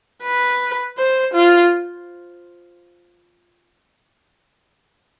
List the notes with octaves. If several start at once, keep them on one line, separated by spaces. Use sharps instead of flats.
B4
C5
F4